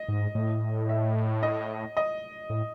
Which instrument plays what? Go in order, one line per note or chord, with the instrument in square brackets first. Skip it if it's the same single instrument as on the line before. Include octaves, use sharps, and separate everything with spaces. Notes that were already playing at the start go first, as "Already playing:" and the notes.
Already playing: [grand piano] D#5
[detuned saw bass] G#2
A2
[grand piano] E5
D#5
D#5
[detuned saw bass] A2